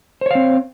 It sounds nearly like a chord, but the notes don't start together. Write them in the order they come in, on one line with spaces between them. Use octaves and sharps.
C5 C#5 F5 C4